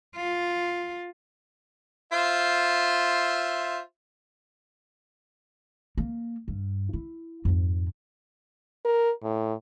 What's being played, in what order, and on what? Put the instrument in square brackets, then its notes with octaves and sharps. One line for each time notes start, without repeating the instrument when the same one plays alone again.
[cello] F4
[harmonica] F4 C5 E5
[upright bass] A#3
G2
E4
F2 G#2
[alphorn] A#4
A2